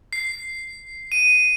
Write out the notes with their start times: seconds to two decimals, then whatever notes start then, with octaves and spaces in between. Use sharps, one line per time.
0.13 C7
1.12 D#7